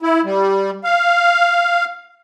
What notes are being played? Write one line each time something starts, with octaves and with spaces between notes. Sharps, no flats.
E4
G3
F5